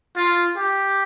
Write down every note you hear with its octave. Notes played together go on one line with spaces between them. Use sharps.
F4
G4